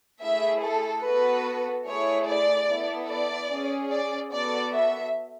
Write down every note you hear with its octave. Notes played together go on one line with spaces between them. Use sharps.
A3 E4 G#4 E5
A4
B3 F#4 A4 B4
A3 E4 G#4 C#5
D5
B3 E4 A4
D5
C#4 G#4
D5
B3 F#4 A4 D5
E5